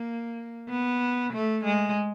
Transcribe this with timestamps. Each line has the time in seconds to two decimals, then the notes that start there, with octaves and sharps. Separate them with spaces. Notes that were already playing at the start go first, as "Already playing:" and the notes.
Already playing: A#3
0.69 B3
1.33 A3
1.64 G#3